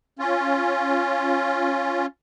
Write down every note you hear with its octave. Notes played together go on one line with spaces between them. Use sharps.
C#4 F4